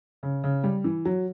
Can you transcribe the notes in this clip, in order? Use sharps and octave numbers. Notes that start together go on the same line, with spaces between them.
C#3
C#3
G3
E3
F#3